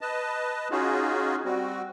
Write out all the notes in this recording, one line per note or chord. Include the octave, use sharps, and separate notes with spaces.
B4 D#5 A5
C#4 D#4 F4 F#4 G#4
G3 C4 F#4